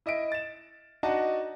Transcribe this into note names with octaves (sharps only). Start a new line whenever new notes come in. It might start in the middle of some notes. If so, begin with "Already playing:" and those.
E4 D#5 E5 D7
A6 E7
D4 D#4 F#4 D#5 F#5 A5